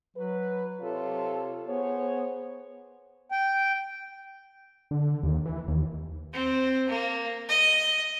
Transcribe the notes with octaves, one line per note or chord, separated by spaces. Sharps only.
F#3 B4
C3 F4 A4 C#5
B3 G#4 C5 C#5
G5
D3
D#2
E3
D#2
C4
A#3
D#5